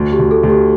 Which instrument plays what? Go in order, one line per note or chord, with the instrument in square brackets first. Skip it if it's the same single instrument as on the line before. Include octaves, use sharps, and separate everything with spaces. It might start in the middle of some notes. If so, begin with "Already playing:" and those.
Already playing: [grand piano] D2
[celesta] G4
[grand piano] D2
[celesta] A4
[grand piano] D2
[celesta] G4